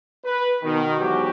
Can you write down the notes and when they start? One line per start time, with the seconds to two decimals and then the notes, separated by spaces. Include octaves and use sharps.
0.25 B4
0.64 B2 D#3
1.00 E2 G#2 F#3 F#4 G4